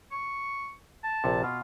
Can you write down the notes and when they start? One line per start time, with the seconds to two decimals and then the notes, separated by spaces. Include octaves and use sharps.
0.12 C#6
1.04 A5
1.24 A#1 C3
1.43 B2 F4